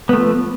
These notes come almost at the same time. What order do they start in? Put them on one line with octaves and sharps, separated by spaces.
B3 A3 F3